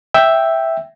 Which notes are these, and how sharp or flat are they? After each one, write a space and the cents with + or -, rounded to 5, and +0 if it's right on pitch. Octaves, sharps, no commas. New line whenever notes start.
E5 +0 G5 +0